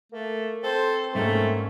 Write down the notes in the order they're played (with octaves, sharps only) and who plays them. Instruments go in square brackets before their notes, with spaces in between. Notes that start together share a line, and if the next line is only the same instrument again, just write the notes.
[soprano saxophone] A3 [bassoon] A#3
[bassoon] C4 [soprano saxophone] A4 [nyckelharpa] C5
[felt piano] G#2 A#3 [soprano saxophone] A3 [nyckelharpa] C#4